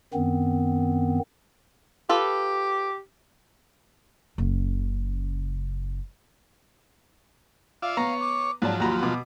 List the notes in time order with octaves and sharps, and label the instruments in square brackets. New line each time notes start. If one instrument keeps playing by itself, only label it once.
[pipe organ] F#2 D#3 B3 C4
[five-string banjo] F4 A4 B4 [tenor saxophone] G4
[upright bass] F#1 C#3
[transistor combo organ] F4 D5 E5 [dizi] F5
[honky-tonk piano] B3 [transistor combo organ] C#5 [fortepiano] A#5
[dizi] D6
[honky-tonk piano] G#2 D5 A5 [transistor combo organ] F3 F#3 [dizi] C#5
[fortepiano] D#2 A#5 [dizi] F4 [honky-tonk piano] F#4 B5
[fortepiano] B2 [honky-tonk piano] D6